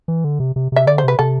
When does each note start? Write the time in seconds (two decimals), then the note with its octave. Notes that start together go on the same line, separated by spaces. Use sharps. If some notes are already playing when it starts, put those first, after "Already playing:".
0.08 E3
0.24 D3
0.40 C3
0.56 C3
0.72 C3 E5
0.87 D3 D5
0.98 C5
1.04 C3 B4
1.19 C3 A4